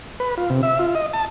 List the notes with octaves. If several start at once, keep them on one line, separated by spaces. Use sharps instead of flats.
B4
F4
C3
E5
F4
D#5
A5